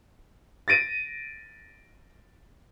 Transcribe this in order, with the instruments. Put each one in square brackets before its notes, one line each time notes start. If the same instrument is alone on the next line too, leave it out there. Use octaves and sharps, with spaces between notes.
[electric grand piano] A6 A#6 D7 D#7